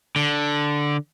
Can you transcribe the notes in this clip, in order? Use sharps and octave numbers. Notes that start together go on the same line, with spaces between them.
D3